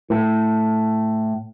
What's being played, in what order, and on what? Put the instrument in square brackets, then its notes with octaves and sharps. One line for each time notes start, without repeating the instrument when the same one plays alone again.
[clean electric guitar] A2